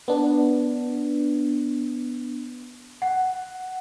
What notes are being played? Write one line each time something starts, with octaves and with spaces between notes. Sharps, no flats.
B3 D4
F#5